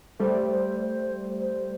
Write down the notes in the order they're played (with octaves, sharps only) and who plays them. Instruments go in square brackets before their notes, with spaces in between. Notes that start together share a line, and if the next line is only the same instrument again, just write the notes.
[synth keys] G3 A3 [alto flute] C5
[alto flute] C5
C5
C5